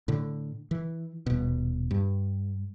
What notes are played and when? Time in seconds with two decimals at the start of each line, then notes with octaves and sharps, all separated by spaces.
0.08 A2 D3
0.71 E3
1.26 D#1 B2
1.91 G2